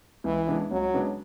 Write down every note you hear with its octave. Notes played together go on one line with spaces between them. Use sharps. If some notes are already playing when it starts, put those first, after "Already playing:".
C#2 E3
C#3 G#3 B3 D4
C#2 F#3
C#3 G#3 B3 D4